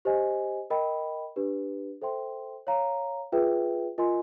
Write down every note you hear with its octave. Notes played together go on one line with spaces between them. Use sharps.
G4 C5 D#5 G#5
A#4 D#5 G5 B5
D4 G4 B4
A4 C5 E5 G5 C6
C#5 F5 A#5
F4 G#4 B4 E5 G5
F4 A#4 D#5 G#5 C6